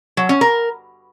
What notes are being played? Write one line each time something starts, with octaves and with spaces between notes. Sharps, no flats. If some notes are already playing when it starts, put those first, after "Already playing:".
F#3
C#4
A#4